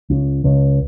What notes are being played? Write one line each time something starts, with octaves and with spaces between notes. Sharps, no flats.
C#2
C#2